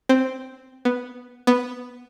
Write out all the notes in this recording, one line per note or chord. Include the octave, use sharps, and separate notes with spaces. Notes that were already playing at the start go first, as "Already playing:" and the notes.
C4
B3
B3